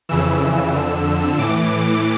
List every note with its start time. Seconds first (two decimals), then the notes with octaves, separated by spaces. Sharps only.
0.09 F2 C#3 E3 E6
0.74 F2 D3
1.38 A2 E3 D6